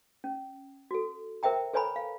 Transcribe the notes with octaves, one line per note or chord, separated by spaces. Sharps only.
C#4
F#4 A4
A#4 C5 E5 G5 A#5
A4 B4 C#5 G#5 A#5 B5
F5